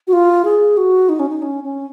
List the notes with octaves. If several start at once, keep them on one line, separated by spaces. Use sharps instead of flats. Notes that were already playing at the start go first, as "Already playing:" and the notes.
F#4
F4
G#4
F#4
D#4
C#4
D#4
C#4
C#4